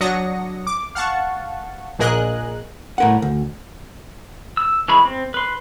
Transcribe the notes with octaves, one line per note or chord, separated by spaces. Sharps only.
F#3 D4 D#6 A#6 C#7
D6
F5 F#5 A5 C#6
A#1 A#2 G#4 A#4 D#5 F#6
A2 A#4 F#5
D2
E6
E3 G#3 G#4 B5 C#6
C4
B4 C6